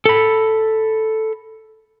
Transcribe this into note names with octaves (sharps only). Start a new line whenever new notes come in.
A4 B5